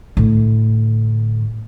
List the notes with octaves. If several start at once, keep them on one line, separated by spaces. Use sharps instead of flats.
A2 D3